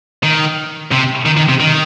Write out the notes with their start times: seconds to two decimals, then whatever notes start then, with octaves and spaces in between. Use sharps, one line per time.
0.23 D#3
0.91 C3
1.26 D#3
1.37 D#3
1.49 C3
1.60 D#3